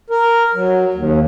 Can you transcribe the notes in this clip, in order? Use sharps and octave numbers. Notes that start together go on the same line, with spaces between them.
A#4
F#3
D#2